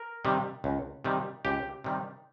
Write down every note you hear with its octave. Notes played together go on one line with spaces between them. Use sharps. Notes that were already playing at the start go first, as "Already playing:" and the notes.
Already playing: A#4
C3 D#3 G3
C#2
C3 D#3 G3
C#2 G4
C3 D#3 G3